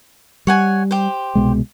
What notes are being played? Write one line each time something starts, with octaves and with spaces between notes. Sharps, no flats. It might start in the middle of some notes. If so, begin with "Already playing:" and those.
G3 C#5 F#5 G#5
G4 C5
C2 B2 G#3